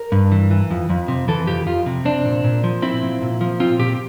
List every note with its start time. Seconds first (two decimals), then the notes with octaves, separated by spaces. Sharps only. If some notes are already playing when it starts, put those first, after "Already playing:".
Already playing: A#4
0.12 G2
0.32 E3
0.51 E3
0.71 F2
0.90 F2
1.08 C3
1.28 E3 A4
1.47 F2 G4
1.67 F2 F4
1.86 C3
2.05 C4 D4
2.25 A#2
2.44 A#2
2.64 F3
2.82 C4 E4
3.02 A#2
3.21 A#2
3.41 F3
3.60 C4 F4
3.79 A#2 G4